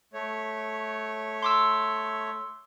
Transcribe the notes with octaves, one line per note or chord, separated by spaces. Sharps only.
A3 C#5
C6 D6 E6